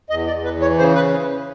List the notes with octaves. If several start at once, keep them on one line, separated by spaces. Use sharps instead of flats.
E2 D#5
D5
E2
B4
E3
C#5
C#3 C5
B4